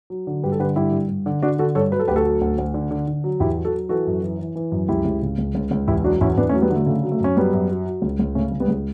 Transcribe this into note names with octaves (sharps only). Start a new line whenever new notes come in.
F#3
D3
G2 G4 B4
A4
D3 G4 B4
G2 E4 G4
G2
G2
D3
D3 D4 F#4
D3 F#4 A4
G2 A4 C#5
F#3 B4
A4
D2 G4 B4
F#4 A4
F#3
D2
D2
D3
D3
D3
F#3
E2 E4 G4
F#3
F#4 A4
F#3
E3 F#4 A4
F#2
E3
E3
E3
F#2
C#2 E4 G4
C#2
C#3
C#2
C#2
C#2
E2 E4 G4
F#3 D4 F#4
E2 C#4 E4
E2 B3 D4
A3 C#4
F#3
G3 B3
D3 A3
C#3 A3
F#3
A3
F#2 C#4
F#3 G3 B3
F#2
F#3
F#3
C#2
C#2
C#3 A3 C#4
C#2
G3 B3
C#2